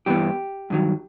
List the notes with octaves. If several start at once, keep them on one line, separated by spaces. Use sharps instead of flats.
G2 E3 B3 G4
G2 D#3 F#3